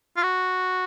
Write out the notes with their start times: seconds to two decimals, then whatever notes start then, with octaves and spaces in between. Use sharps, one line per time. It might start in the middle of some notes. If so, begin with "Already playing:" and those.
0.17 F4
0.23 F#4